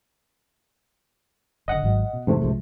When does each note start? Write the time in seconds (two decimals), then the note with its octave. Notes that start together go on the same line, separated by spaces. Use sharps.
1.68 F#1 D3 D#5 F#5
1.83 G#1 G#2 F#3
2.13 B2
2.27 F2 G#2 C3 E3 A3
2.41 C2 F3 G#3